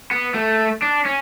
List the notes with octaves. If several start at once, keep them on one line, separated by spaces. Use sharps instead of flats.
B3
A3
D4
C#4